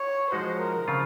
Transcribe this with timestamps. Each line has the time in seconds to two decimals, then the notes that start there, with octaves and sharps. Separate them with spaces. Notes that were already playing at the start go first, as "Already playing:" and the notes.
Already playing: C#5
0.31 F3 G#3 D#4 F#4 C5
0.60 A#4
0.88 C#3 F3 C4 F4